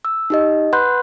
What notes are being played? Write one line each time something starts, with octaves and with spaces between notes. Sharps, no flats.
E6
D#4 G4 D#5
B4 F#5 B5 C6 F#6 G6